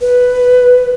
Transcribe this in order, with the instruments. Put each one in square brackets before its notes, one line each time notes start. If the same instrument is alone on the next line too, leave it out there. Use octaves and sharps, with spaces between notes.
[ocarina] B4